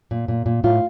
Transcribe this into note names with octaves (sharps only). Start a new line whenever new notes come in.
A#2
A#2
A#2
A2 F4